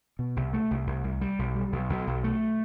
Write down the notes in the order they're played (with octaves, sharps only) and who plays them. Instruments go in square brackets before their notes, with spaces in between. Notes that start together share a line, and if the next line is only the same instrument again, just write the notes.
[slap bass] B2
C2
A3
C2
C2
C2
G3
B1
G3
B1
B1
B1
A3